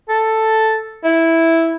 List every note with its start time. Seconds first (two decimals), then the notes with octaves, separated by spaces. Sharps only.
0.09 A4
1.04 E4